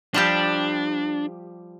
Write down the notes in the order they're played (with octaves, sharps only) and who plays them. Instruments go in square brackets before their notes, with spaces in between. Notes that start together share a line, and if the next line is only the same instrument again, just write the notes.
[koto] F3 G3 G4 [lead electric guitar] D4